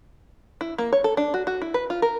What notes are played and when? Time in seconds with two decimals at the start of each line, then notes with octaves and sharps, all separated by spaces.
0.61 E4
0.78 A#3
0.93 C#5
1.04 A4
1.17 D4
1.34 F#4
1.47 F#4
1.62 E4
1.74 B4
1.90 F4
2.02 A#4